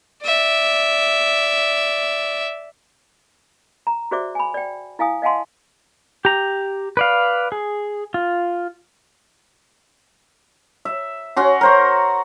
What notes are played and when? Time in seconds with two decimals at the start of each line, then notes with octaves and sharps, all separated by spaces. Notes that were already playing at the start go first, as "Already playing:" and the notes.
0.23 D5 E5
3.87 A#5
4.11 F#4 G#4 C5 D5 E5 D6
4.35 G#5 B5
4.54 D5 G5
4.99 E4 F5 G#5 D#6
5.22 D#5 F5 F#5 G#5 A5 C6
6.25 G4 A#5
6.97 B4 D5 F5
7.52 G#4
8.14 F4
10.85 E5
11.36 C#4 F#4 C6
11.61 A#4 C5 C#6